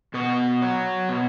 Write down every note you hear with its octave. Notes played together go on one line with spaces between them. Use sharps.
B2 F#4
F#3
B2